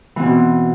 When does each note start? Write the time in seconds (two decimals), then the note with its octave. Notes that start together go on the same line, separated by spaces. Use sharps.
0.16 E3
0.19 C4
0.22 B2